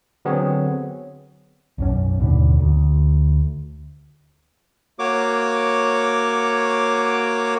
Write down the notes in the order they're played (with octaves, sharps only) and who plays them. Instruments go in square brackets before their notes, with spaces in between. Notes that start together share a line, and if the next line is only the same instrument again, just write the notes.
[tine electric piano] D3 F#3 B3 C4 G#4 C#5
[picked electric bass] B1 F#2 C#4
D#2 G#2 B2 D3
D2
[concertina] A#3 F#4 C#5 D6